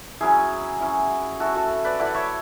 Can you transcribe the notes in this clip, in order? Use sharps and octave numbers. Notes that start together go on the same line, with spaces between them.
F#3 C#4 E4 G#4
F#3 C#4 E4
A3 E4 F#4 A4
F#4 A4
B4 D5
A3 E4 D5 F#5
C#5 E5